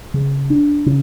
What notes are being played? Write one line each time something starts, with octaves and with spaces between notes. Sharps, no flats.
C#3
D4
C#3